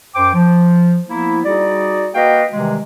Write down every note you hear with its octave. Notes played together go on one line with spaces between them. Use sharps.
F#2 C5 G5 D6
F3
F3 A#3 B3 E4
G3 D#4 F#4 G#4 D5
A#3 F#4 B4 D#5 F5 G5
C3 D#3 E3 G3 G#3